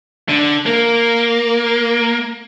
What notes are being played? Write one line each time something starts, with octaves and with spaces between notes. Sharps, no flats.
D3
A#3